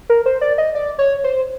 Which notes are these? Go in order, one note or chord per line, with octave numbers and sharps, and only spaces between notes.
A#4
C5
D5
D#5
D5
C#5
C5